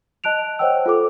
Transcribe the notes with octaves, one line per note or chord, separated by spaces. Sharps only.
D#5 A5 F#6 D7 F7
C5 C#5 D#5 F#5 G5 E6
F4 A4 D6